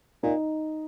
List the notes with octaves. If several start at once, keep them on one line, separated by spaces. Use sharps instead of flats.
A#2 D#4